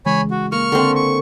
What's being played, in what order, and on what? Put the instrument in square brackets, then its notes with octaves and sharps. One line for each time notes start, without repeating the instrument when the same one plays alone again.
[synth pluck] C#3 E3 G#3 [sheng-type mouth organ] C#5 G#5 B5
[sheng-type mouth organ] F#4
[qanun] A#3 [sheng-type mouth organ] C#6 F6
[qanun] D3 C4
[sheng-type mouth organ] C#6